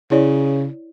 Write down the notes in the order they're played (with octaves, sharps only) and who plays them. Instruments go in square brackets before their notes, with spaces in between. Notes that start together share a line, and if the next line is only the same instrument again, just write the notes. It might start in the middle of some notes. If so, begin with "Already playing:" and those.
[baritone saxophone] C#3 [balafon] E4 C#5 D5